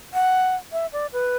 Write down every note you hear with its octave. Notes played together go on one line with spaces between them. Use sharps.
F#5
E5
D5
B4